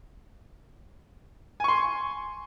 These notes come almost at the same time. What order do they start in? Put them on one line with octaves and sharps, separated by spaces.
G#5 C#6 C6